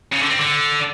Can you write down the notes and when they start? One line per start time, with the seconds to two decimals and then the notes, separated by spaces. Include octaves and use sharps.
0.13 C#3
0.21 D3
0.30 C4
0.39 D3